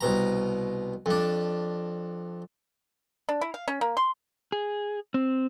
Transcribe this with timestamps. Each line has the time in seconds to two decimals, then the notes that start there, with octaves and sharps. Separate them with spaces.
0.01 C2 B2 A#5
1.06 F2 D4
3.29 D4
3.41 E4
3.54 F5
3.68 C#4
3.81 A#3
3.97 C6
4.52 G#4
5.14 C4